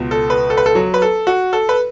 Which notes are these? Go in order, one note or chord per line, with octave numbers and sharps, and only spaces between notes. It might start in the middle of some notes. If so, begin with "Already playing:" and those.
Already playing: C#2 B2
A4
B4
A4
B4
A4
F#3
B4
A4
F#4
A4
B4